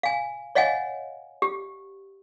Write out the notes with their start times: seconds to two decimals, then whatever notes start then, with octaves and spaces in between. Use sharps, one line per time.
0.03 F5 G#5
0.55 C#5 D#5 F5 F#5 G#5
1.42 G4